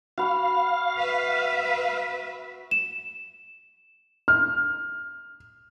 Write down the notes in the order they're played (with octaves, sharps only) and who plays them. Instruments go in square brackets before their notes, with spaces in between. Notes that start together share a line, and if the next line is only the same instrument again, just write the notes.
[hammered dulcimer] F#4 B5 [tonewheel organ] F5
[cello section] B4 E5
[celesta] E7
[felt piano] F6